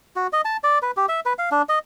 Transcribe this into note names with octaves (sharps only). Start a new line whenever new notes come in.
F#4
D#5
A5
D5
B4
G4
E5
B4
F5
D4
D#5